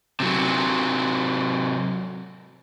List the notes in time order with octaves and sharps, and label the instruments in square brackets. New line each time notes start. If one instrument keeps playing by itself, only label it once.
[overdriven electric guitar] C3 F#3